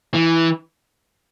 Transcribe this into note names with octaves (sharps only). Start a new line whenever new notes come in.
E3